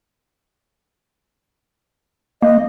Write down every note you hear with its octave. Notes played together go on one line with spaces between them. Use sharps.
A#3 D#5